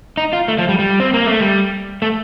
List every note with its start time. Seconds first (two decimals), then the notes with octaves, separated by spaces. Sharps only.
0.17 D#4
0.33 F4
0.48 A3
0.58 F3
0.69 G3
0.79 G3
1.00 C4
1.14 A#3
1.27 A3
1.40 G3
2.02 A3